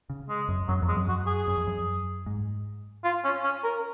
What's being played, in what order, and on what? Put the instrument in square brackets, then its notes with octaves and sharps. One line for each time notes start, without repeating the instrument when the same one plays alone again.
[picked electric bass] C#3
[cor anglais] G#3
[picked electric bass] F#2
[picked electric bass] F#2 [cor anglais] F#3
[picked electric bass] F2
[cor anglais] G#3
[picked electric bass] F#2
[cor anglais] F#4
G#4
[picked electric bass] F#2
F2
F#2
G#2
[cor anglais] F4
C#4
C#4
A#4